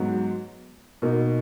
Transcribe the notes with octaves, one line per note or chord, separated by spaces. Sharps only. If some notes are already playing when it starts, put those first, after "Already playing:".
Already playing: G#2 F#3 B3
B2 A#3 D#4